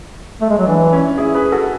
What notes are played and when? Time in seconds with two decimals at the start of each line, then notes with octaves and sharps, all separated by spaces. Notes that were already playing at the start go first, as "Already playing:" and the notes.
0.41 A3
0.50 G#3
0.58 F#3
0.67 E3 D4
0.93 C#4 E4
1.18 E4 G#4
1.35 G#4 B4
1.52 F#4 A4